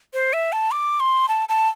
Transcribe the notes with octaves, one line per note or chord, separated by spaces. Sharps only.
C5
E5
A5
D6
C6
A5
A5